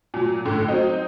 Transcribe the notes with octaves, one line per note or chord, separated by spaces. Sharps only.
A#2 F#3
A2 D3
F#3 C4 D#4